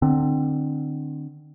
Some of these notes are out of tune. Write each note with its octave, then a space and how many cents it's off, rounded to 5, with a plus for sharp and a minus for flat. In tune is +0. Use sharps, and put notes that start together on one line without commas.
D3 +30 C4 +0